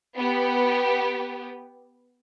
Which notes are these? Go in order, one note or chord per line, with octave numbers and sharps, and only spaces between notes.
B3 G4